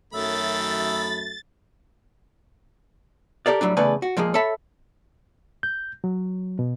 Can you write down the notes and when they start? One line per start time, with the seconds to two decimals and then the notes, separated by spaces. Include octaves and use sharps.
0.13 F#2 D#3 A3 E5 B5 A6
3.46 G4 A4 A#4 D5
3.61 A2 F#3 G3 D4
3.77 E2 C#3 A3 B4 D5 G#5
4.02 F#4
4.17 A#2 F3 G#3 A#3 G#4
4.34 A4 C#5 E5 A5 B5
5.63 G6
6.04 F#3
6.59 B2